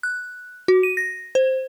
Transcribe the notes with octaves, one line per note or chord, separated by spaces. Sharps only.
F#6
F#4
D#7
A#6
C5